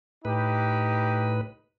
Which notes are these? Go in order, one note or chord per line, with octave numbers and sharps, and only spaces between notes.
A2 D#4 G4 B4